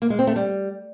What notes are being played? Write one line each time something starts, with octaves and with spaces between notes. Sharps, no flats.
A#3
G#3
C4
A3
G3